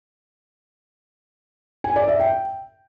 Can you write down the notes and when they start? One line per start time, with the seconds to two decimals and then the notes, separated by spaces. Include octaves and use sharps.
1.84 G#5
1.96 D5
2.08 E5
2.19 G5